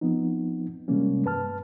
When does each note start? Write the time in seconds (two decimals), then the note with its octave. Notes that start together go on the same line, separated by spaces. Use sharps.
0.01 F3 B3 C4 D#4
0.88 C3 E3 G3 G#3 A#3 C#4
1.25 G2 B4 A5 F6